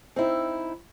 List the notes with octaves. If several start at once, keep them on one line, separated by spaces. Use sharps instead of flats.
C4 D#4 E4